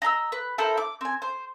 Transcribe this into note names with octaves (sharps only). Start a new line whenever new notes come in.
D#5 A#5 B5 E6
B4
E4 A4 A#4 C5
D6
C4 G#5
C5